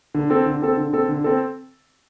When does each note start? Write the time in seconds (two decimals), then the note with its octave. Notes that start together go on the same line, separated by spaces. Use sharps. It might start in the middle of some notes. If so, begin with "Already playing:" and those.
0.14 D3
0.30 C4 A4
0.46 D3
0.62 C4 A4
0.77 D3
0.93 C4 A4
1.08 D3
1.24 C4 A4